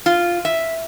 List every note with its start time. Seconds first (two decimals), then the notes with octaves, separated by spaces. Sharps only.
0.06 F4
0.45 E5